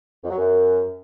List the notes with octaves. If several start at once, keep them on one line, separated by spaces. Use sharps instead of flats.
F2
F#3
F#2